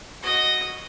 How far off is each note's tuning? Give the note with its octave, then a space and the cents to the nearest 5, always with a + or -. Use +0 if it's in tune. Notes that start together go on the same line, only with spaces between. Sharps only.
F#4 +0 D#5 -5